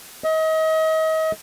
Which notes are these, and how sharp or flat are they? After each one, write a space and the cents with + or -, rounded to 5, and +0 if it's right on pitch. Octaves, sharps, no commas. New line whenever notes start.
D#5 +35